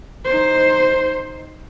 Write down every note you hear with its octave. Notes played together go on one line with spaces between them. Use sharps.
D#4 C5